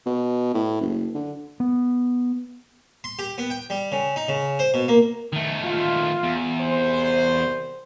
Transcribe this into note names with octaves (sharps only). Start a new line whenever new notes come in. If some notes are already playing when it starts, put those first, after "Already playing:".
B2
A2
F#1
D3
B3
C6
G4
B3
G5
G3
C#3
D#4
C#3
C5
B2
A#3
D#3 A3
F4
E2
C2 C5